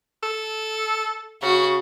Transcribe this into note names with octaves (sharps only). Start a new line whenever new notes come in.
A4
C#3 F#4